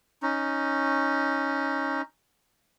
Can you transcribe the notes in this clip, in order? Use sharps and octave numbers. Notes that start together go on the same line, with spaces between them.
C#4 D#4